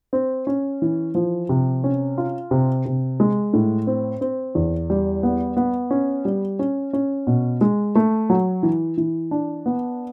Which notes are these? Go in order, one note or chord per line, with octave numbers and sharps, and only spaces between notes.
C4
C#4
E3
F3
C3
C#4
F4
C3
C3
G#3
A2
C4
C4
E2
G3
B3
B3
C#4
G3
C#4
C#4
B2
G#3
A3
F#3
E3
E3
D4
B3